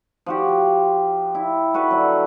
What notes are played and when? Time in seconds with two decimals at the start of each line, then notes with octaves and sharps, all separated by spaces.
0.26 F3 F#4 G4
0.48 F3
1.35 E4
1.74 F#4 A4 B4 E5
1.91 D3 F#3